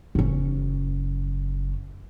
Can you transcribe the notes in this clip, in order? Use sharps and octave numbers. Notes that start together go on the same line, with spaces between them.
F#1 C#4